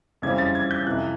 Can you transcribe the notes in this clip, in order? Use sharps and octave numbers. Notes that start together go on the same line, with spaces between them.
F2 C#3 E3 G3 C4 G#6
A6
G#6
G6
F2 C3 E3 F#6